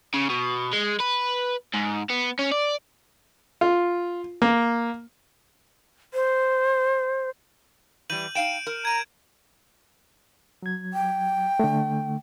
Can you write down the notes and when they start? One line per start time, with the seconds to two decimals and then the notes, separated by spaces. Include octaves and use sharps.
0.14 C#3
0.30 B2
0.73 G#3
1.00 B4
1.74 G#2
2.10 B3
2.39 C#4
2.52 D5
3.61 F4
4.42 A#3
6.14 C5
8.10 E3 G3 G6 D#7 F#7
8.35 D#4 F5 G5 D7 E7
8.67 A#4
8.85 A#5 G#6 D#7
10.63 F#3 G#6
10.93 G5
11.60 D3 A3